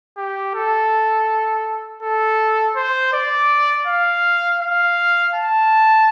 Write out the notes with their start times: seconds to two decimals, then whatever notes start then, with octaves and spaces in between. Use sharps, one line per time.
0.17 G4
0.54 A4
2.03 A4
2.76 C5
3.13 D5
3.87 F5
4.61 F5
5.35 A5